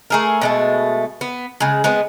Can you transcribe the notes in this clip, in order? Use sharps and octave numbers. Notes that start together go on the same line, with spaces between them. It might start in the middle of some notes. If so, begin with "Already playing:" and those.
A3 G#4 A#4
B2 G#3 A3
B3
C#3 G#3
G#3 B3 C4